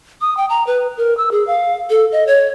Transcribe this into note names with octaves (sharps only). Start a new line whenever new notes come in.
D#6
G5
A#5
B4
A#4
E6
G#4
F5
A4
D#5
C#5